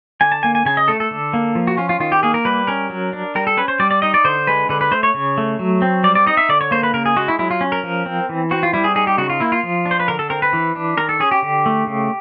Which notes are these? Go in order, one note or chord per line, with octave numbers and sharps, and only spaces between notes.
D3 G#5
A5
A#3 G#5
G#5
C#3 G#5
D#5
A3 A4
A4
D3
A#3
F3
F#4
C#4 F4
F4
D#3 F4
G4
A#3 G#4
A#4
G3 B4
C#4 A#4
F#3
D4
G3 A#4
A4
C#4 B4
C5
G3 D5
D5
D#4 D#5
D5
D3 C5
G#3 B4
D3 B4
B4
A3 C5
C#5
C#3
A3
F#3
C4
G3 D5
D5
D#4 D#5
E5
D3 D5
C#5
A#3 C5
B4
C#3 A#4
G#4
G#3 F#4
E4
F#3 E4
F4
C#4
A#4
F3
C4
E3
C4 F#4
F4
G3 E4
G#4
D#4 G#4
G4
C#3 F#4
F4
A#3 E4
F4
F3
D4
C5
B4
D3 A#4
A4
C4 A#4
B4
E3
D4
D#3 A#4
A4
C#4 G#4
G4
D3
A3
C#3